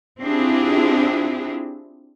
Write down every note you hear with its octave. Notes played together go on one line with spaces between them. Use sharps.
C4 D4 E4 F4 G4 G#4